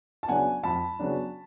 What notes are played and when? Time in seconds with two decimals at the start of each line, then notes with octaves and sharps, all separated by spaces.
0.23 A5
0.28 C#3 F#3 B3 D4 F#5 G#5
0.63 F2 A5 B5
0.99 C#3 F#3 B3 D4